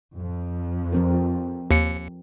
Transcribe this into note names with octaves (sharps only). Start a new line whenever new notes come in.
F2
F3 C4 A#4
D#2 C#7